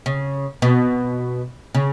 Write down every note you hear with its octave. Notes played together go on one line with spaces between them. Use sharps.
C#3
B2
C#3